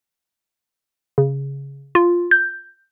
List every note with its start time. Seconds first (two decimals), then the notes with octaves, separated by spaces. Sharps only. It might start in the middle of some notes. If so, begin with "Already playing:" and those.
1.18 C#3
1.95 F4
2.31 G6